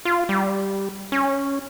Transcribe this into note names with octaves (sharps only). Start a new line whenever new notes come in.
F4
G3
C#4